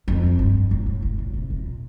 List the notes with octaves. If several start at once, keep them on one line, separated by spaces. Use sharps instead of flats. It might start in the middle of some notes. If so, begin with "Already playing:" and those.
F2
G2
A2
A2
A2
A#2
C3
A#2